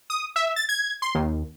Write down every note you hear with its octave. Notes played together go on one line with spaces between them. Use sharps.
D#6
E5
A6
G#6
C6
D#2